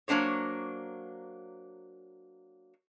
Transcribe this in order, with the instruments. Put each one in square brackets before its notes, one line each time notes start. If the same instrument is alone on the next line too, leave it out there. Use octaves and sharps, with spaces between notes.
[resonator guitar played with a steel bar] F#3 A#3 D4 C5 C#5